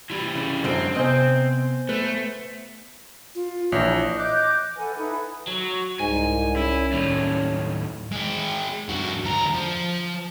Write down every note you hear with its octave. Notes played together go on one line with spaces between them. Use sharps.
E3 G3
C#3
F#2 D3 G#3 C4
C3 B3 C5 D#5 G#5
A3 B4
F4
A#1 E3 C#5
D#5 D6 F#6 G6
A4 B4 F#5 G#5
D#4 E4 A4 B4
F#3
C2 G#2 G#5
C#4 E4
D#2 A2 G3
G#3 G5
G2 F#4
D2 A#5
F3